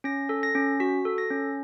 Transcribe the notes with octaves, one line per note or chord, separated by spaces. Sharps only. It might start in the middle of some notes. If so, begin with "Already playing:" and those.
C#4 A#6
A4
A#6
C#4
F#4 B6
A4
A#6
C#4